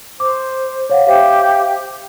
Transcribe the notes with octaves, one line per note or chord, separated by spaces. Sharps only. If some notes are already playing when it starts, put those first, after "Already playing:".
C5 D6
C#5 F5 F#5
G4 C5 E5 F5